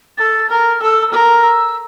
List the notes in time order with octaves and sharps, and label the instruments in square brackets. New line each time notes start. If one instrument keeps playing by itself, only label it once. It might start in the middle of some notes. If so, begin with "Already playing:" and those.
[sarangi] A4 [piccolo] A6
[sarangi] A#4 [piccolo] F6
[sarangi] A4 [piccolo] E6
[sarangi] A#4 [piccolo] F6
[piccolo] E6